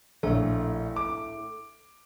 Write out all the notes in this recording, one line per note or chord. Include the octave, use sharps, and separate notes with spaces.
A#1 A2 A3
D6